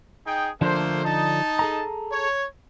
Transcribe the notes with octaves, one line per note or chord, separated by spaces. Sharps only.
D#4 G#4 G5
D3 F3 A3 A#3 D4 C5
D#4 A5
G#4 A4 A#5
C#5